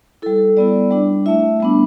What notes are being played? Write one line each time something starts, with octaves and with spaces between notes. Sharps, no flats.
G3 E4 A4
G3 B3 E4 D5
G3 D4
A3 E4 E5
G3 B3 D4